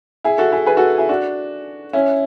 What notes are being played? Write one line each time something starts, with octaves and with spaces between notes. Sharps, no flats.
E4 G#4
F#4 A4
E4 G#4
G#4 B4
F#4 A4
E4 G#4
D4 F#4
C#4 E4